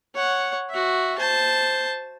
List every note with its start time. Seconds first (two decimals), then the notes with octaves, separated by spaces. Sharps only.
0.14 C#5 F#5
0.70 F#4 E5
1.18 C5 A5